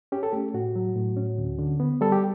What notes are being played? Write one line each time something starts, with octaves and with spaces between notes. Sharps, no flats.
C#4 G4
A4
A3 G4
A2 F#4
F#3
A2
C#4
D2
D3
B3
G3 A4
G4